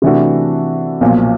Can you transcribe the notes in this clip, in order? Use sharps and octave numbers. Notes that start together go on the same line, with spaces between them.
C3 E3 A3 D4 F#4
B1 A#2 F3